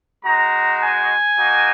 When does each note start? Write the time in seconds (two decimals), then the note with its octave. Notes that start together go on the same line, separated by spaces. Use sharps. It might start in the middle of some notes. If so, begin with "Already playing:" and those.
0.25 G#3 D#4 F#4 A#5
0.81 G#5
1.38 A#3 D#4 F#4